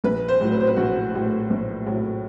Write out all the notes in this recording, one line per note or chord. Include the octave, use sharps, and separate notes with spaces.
A#1 B4
C5
A2 F#3
B4
C5
B4
A#1 F#4
A2 F#3
A#1
A2 F#3